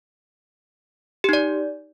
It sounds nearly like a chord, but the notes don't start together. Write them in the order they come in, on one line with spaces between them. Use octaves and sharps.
G4 D#4 D5